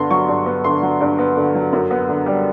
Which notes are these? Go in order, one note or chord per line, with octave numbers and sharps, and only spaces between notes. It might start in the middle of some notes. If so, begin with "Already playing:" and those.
Already playing: G2 D3 B3 C6
F#3 C#6
G2
B3
D3 C6
F#3
G2
B3
D3
F#3
F#2
B3
D3
G3